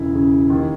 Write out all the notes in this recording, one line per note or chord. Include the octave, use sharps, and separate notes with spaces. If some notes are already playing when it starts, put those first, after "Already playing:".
Already playing: E1 C#3 E4
C#3
D#2